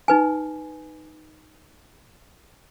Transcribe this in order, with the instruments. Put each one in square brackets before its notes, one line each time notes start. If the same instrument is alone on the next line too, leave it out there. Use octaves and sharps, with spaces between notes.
[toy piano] D#4 B4 G#5